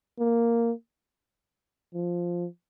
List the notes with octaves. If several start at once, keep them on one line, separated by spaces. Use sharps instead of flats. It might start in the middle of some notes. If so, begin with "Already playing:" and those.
A#3
F3